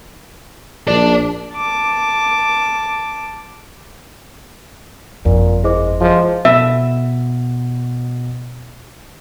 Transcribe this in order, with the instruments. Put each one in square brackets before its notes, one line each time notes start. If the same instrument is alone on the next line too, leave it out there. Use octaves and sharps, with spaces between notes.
[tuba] A#1 [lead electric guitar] D4 D5
[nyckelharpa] A5 D6
[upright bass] G1 F2 [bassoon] A#2
[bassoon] G#3 [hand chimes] E4 C5 D6
[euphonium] F3 [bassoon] G#3
[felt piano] B2 [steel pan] E5